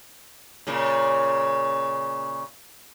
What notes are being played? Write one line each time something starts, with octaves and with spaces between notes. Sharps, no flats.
A#2 C#3